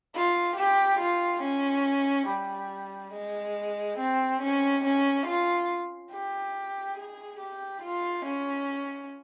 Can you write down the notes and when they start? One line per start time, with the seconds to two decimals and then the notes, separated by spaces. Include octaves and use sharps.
0.14 F4
0.56 G4
0.99 F4
1.42 C#4
2.27 G3
3.12 G#3
3.99 C4
4.41 C#4
4.84 C#4
5.26 F4
6.12 G4
6.97 G#4
7.39 G4
7.82 F4
8.25 C#4